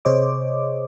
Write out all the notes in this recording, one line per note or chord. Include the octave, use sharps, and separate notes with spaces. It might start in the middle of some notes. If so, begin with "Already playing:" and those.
C3 G#4 C5 C#5 D#5 D6